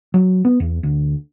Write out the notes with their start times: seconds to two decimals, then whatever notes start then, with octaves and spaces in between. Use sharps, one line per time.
0.14 F#3
0.45 B3
0.60 E2
0.83 D2